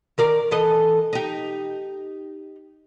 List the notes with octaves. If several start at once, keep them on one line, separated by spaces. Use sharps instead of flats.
D#3 A#4 D5
E3 A4 D#5
D#4 G4